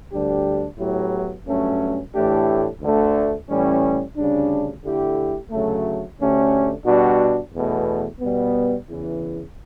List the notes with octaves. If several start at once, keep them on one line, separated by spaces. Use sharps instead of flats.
D2 D3 G3 D4 G4
A2 F#3 B3 E4 G4
G2 F#3 A3 C#4
A2 E3 A3 D4 G4
D2 D3 A3
A2 E3 G3 C#4
D2 C#3 G3 D4
D3 A3 E4 G4
D2 C#3 F#3 A3
D2 D3 A3 C#4 G4
B2 G3 D4 F#4
E2 B2 A3
B2 G3 B3
E2 C#3 E3